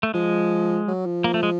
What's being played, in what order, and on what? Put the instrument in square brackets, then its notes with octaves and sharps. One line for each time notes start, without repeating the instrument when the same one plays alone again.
[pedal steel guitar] A3
[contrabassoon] F3 [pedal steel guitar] G#3
[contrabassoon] F#3
F3
[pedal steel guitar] A#3
A3
G#3